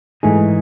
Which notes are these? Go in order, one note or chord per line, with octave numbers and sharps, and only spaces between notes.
G#2 E3 A3 D#4 G#4